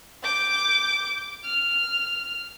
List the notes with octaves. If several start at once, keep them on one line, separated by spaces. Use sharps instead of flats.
D6 G6
F6